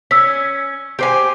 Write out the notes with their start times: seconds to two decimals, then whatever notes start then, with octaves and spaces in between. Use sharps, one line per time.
0.11 C#4 E6 B6
0.99 G4 C5 G#5